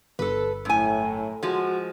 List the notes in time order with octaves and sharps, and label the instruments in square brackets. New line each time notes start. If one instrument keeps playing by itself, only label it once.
[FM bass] G1 [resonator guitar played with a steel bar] A4 B4
[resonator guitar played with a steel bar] F#2 G#5 [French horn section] A2
[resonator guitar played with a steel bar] F3 G#3 [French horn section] F#4